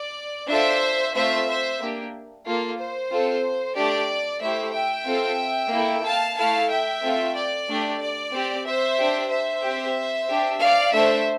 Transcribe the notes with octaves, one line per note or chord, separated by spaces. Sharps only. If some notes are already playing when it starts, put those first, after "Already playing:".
Already playing: D5
D4 F4 A4 C5 E5
A3 C4 F4 C5 E5
C5 E5
A#3 D4 G4
A#3 F4 A4
C5
C4 F4 A4
A3 D4 G4 D5
A3 E4 G4 C5 E5
E5 G5
C4 F4 A4
A#3 E4 A4
F5 A5
A3 E4 A4 F5 A5
E5 G5
A3 C4 F4 A4
D5
A3 D4 G4
D5
C4 G4
C5 E5
D4 G4
C5 E5
C4 G4
D4 G4
D5 F5
A3 D4 A4 C5 E5